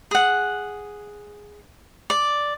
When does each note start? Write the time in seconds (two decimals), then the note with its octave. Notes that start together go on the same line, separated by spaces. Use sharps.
0.11 G#4 F#5
2.10 D5